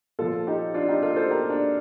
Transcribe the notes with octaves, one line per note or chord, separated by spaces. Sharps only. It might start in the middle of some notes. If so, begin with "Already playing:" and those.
A#2 F3 F4 A4
D#4 G4
D4 F4
D#4 G4
F4 A4
A4 C5
G4 A#4
D4